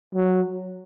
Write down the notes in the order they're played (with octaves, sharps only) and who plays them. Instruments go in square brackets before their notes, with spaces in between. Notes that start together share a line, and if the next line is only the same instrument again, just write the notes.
[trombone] F#3